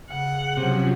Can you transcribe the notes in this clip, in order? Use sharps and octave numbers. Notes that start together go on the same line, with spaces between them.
C#3 F#5
C3 F3 F#3 C#4